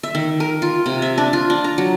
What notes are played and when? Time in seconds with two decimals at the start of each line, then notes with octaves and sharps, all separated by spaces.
0.03 E5
0.15 D#3
0.40 A#4
0.62 F4
0.86 C3
1.02 E5
1.18 D4
1.33 F4
1.50 D4
1.64 A#5
1.78 F#3